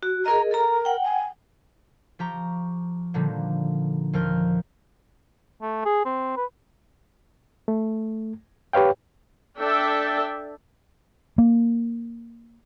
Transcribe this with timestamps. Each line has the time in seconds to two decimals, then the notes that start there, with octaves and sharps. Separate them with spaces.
0.03 F#4
0.26 G#4 A#4 D#5 A#5
0.51 A4 A#4 A#5
0.85 F#5 G5
1.04 G#5
2.19 F3 G4 A#5 C#6
3.14 A#2 D3 D#3 F3 G3 A#3
4.13 D#2 F3 A#4 F6 G6
5.62 A3
5.85 G#4
6.06 C4
6.37 B4
7.68 A3
8.73 G4 B4 C#5 F5 G5
9.58 D4 A4 D5 E5 G5 A5
11.38 A#3